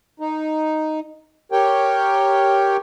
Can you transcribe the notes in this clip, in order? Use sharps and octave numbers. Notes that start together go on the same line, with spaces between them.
D#4
G4 A#4 C#5 G5